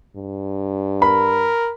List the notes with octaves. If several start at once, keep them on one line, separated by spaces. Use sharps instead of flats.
G2
A#4 B5